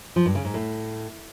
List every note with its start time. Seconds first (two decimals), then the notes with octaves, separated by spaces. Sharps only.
0.16 F3
0.25 G2
0.35 C#3
0.45 G#2
0.54 A2